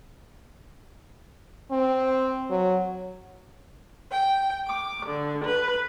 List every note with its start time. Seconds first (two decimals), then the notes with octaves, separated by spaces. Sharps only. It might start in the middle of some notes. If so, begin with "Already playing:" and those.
1.71 C4
2.50 F#3
4.10 G5
4.68 D6
5.06 D3
5.45 B4